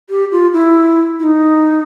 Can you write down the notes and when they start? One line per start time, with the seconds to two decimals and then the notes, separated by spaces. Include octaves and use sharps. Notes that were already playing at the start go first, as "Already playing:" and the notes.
0.10 G4
0.32 F4
0.53 E4
1.19 E4
1.23 D#4